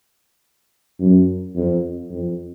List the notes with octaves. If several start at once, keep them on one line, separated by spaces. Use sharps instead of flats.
F#2
F2
F2